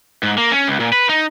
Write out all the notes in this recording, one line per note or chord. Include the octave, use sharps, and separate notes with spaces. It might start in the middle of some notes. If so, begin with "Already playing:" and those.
G#2
A#3
C#4
C#2
A#2
B4
D#4